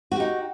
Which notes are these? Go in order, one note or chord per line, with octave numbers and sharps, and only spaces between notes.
D#4 F#4 G4